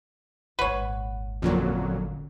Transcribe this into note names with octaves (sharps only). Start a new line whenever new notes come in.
D#1 G#1 B4 C#5 F#5
F2 A#2 D3 F#3 C#4